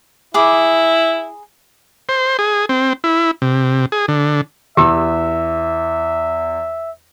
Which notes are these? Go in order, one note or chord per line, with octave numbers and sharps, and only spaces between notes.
E4 G#4 B5 D6
C5
G#4
C4
E4
C3
G#4
D3
E2 G4 E5 E6